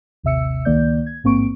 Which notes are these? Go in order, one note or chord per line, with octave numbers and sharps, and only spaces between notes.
A1 D#2 C3 E5 E6 C#7
C#2 D#3 A#3 D5 G6
G#6
A1 G#2 A#3 C4 C#6 D7